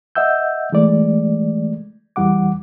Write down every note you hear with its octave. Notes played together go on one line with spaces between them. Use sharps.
D#5 E5 F#5 E6 G6
E3 G#3 A3 D5
E2 E3 G3 F#5 D6